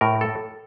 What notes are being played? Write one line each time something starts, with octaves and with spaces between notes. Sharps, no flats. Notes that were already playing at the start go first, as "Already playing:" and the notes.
A2 A#4
A4